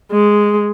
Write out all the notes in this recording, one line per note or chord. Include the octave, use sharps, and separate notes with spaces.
G#3